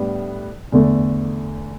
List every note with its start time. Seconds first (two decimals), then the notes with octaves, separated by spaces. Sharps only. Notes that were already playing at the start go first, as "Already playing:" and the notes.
Already playing: A2 G3 B3 D4
0.72 E2 D3 A3